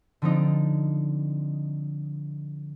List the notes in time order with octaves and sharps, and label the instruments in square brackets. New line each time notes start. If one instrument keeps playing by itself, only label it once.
[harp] D3 F3 C4 D4 D#4